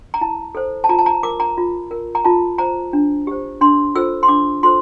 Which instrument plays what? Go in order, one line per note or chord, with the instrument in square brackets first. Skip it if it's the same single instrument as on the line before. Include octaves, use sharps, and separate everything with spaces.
[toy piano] A#5
E4 A5
A4 C5
A5
F4 A#5
A5
A#5
A#4 D6
A#5
F4
A#4
A#5
F4 A5
C5 A#5
D4
G4 C5
D4 C6
F4 A4 C5 E6
C6
D4 D6
F4 A4 C5 C6